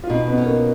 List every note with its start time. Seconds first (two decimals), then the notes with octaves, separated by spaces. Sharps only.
0.04 F4
0.10 B2 D#4
0.28 B3
0.38 C#4
0.46 A#3